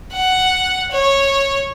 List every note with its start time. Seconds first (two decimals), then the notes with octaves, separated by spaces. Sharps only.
0.13 F#5
0.92 C#5